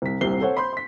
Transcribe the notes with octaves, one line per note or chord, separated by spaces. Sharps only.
C2 B6
D#1 C2 C3 C7 G7
A4 C5 C#5 F#5
C5 B5 C6 G6
C6 B6